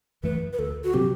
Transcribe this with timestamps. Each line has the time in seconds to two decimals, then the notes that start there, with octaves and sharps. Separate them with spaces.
0.23 F#2 E3 A3 B4
0.53 B4
0.59 D2 A4
0.84 F#4
0.94 C3 F#3 C4 G4